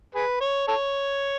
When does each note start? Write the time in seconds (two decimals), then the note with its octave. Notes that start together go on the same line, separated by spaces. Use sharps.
0.15 G#4 B4
0.41 C#5
0.68 A4 C#5